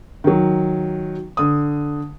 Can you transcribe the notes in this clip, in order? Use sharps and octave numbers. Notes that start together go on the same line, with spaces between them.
D#3 F#3
D3 D#6